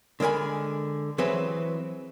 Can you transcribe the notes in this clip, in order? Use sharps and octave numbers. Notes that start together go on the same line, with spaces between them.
D3 G#3 A#4 G#5 B5
E3 F#3 C4 G#4 B4 E5